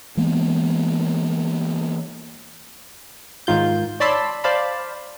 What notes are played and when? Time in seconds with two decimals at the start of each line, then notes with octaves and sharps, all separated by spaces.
0.17 E3 G#3 A#3 B3
3.47 G#2 D#3 F4 G6
4.00 C#5 D5 A5 B5 C6 E6
4.44 C5 D5 F5 A5 B5